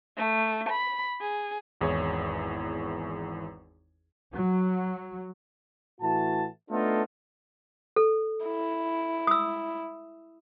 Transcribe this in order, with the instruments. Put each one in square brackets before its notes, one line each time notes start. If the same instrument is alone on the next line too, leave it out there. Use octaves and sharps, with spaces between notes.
[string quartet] A3
B5
G#4
[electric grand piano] G#1 E2 E4 G#4 C#5
[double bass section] F#3
[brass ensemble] A2 E3 F#4 A5
A3 B3 D4 D#4 F4 A4
[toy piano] A4
[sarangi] E4
[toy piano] D#6 E6